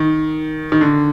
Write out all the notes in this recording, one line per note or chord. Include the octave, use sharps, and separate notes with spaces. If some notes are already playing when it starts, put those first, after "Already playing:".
Already playing: D#3
D#3
D3